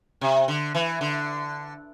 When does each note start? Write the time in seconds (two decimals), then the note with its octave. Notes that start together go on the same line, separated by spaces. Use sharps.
0.21 C3
0.48 D3
0.75 E3
1.01 D3